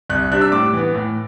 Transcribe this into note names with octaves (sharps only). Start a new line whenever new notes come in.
C2 F#6
C3 G3 D4 F#6
E6
A2 D6
E3 B3
A2